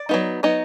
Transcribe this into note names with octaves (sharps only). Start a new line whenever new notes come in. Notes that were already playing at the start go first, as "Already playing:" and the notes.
Already playing: D5
F#3 B3 D#4
F#3 B3 D#4